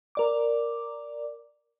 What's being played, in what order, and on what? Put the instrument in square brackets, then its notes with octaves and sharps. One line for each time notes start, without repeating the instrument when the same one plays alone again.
[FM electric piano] A#4 D5 D6